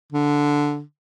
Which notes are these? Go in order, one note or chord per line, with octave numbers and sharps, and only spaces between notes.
D3